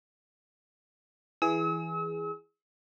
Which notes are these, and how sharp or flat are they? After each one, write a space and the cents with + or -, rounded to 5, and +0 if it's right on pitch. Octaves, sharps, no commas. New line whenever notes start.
E3 +0 G#4 +0 E6 -45